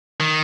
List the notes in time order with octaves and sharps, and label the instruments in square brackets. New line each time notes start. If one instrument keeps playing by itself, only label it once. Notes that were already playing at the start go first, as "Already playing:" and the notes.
[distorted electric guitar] D#3